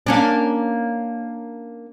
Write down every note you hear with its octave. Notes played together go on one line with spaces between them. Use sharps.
A#3 C#4 D4